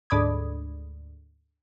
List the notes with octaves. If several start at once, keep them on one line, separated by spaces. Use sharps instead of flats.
D2 G#2 D5 B5 D#6 G#6